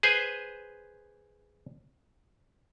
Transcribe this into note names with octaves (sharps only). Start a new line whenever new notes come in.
G#4 B4 C5 G#5